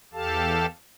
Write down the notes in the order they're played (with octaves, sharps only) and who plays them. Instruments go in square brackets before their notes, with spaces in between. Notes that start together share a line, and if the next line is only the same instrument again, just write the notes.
[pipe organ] E2 G4 A4 F5 A5